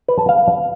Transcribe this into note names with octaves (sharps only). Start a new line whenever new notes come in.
B4
A5
F5